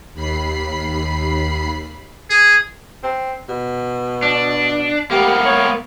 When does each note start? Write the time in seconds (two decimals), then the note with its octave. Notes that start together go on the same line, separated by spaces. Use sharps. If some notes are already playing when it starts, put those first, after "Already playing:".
0.14 D#2 B5 C7
2.30 G#4
3.03 C4
3.49 B2
4.23 D4
5.11 A#3 B3 G4
5.45 C#5